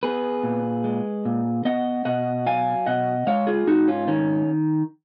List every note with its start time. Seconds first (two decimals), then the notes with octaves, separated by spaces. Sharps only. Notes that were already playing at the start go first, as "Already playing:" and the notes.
0.03 B3 G#4 B4
0.43 A#2
0.84 G#3
1.25 A#2
1.65 B3 D#5 F#5
2.05 B2 D#5 F#5
2.46 F#3 F5 G#5
2.86 B2 D#5 F#5
3.27 G#3 C#5 F5
3.47 F4 G#4
3.67 G#2 D#4 F#4
3.88 C#4 F4
4.07 D#3 C#4